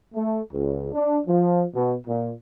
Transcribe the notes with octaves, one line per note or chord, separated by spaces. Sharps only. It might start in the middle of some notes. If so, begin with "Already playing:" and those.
A3
C#2
D4
F3
B2
A#2